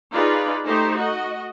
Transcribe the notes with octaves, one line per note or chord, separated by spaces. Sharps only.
D#4 F4 G#4 B4 D5
A3 D#4 G4 C5
F#4 D#5